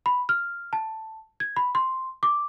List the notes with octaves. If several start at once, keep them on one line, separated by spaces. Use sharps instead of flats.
B5
F6
A5
G#6
B5
C6
D6